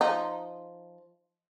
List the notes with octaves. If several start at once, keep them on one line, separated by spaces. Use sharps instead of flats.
F3 D#4